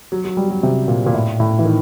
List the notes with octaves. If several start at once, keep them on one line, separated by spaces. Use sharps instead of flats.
F#3
F#3
G3
F#3
C3
A#2
A#2
A2
A2
E3
D#3